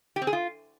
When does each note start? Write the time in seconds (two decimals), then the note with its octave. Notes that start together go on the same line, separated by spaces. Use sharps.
0.16 G4
0.22 C4
0.27 G#4
0.33 F4